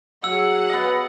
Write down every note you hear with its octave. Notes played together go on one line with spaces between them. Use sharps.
F#3 G#4 F#5 E6
B3 D#5